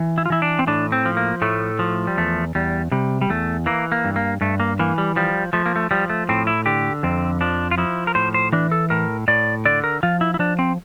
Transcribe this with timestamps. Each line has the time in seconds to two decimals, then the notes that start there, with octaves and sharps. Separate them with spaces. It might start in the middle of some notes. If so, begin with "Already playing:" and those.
Already playing: E3
0.18 E4
0.26 F4
0.30 E3 E4
0.42 D4
0.59 C4
0.67 A2 D4
0.92 C4
1.05 F3
1.17 A#3
1.42 A2 A3
1.79 F3
2.07 G3
2.17 E2 A3
2.55 E2 G3
2.91 C3 G3
3.21 G3
3.29 E2 A3
3.66 E3 A#3
3.92 A#3
4.05 G2
4.16 A#3
4.41 G2 A3
4.60 A#3
4.79 E3 A#3
4.98 G3
5.16 F3 G3
5.53 F3 A3
5.66 A#3
5.76 A3
5.91 F3 G3
6.10 A3
6.29 A2 C4
6.47 E4
6.66 D3 G4
7.03 F2 C4
7.41 F3 D4
7.71 F4
7.78 F3 E4
8.07 A#4
8.15 A2 C5
8.34 C5
8.52 E3 D4
8.72 A4
8.90 A2 A#4
9.28 A2 D5
9.65 D3 D5
9.84 A#4
10.03 F3 F4
10.21 E4
10.34 E4
10.39 F3 D4
10.59 C4